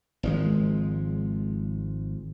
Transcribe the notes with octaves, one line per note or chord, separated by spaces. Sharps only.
G#1 F3 G#3